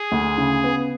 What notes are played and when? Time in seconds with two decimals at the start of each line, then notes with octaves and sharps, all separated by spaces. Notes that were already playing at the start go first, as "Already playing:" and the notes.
Already playing: G#4
0.12 D2
0.38 C#3
0.64 B3